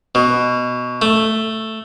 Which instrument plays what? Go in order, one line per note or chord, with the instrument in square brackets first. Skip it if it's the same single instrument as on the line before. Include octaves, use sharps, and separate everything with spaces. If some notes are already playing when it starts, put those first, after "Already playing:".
[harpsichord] B2
A3